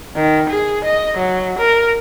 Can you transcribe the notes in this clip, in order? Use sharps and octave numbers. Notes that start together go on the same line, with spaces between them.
D#3
G#4
D#5
F#3
A#4